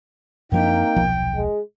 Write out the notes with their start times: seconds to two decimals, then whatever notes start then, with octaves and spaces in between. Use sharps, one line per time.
0.52 F#2 F3 A#3 C4 D4 D#4 G5
0.96 D#1 B1 F3
1.35 G#3